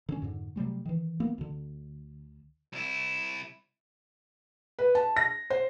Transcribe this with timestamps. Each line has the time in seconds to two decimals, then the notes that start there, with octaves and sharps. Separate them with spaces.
0.09 D3 C#4
0.22 F2 G#2 D3
0.56 C3 F#3 G3 A3
0.85 D#3 E3
1.20 A#3 B3
1.38 D2 D3
2.73 C2 E4
4.79 B4
4.95 A5
5.17 A#6
5.50 C5